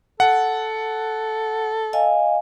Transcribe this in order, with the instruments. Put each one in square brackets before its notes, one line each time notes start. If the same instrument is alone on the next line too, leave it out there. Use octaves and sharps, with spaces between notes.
[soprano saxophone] A4 [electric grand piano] F#5
[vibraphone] D#5 F5 G#5